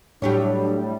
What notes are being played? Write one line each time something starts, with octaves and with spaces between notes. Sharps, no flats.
A2 F#3 G3 D4 G4 C#5